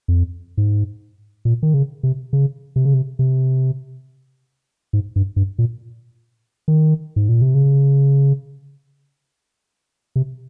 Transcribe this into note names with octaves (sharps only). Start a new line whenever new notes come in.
F2
G#2
A#2
D#3
C#3
C3
C#3
C3
C#3
C3
C3
G#2
G2
G2
A#2
D#3
G#2
A#2
C3
C#3
C3